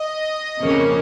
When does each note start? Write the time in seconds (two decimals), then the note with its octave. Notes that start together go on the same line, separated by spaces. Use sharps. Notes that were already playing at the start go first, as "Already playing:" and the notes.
Already playing: D#5
0.60 F2 C#3 A#3 C#4